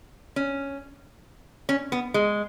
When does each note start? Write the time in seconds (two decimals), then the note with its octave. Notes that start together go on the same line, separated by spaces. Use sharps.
0.36 C#4
1.69 C#4
1.92 B3
2.14 G#3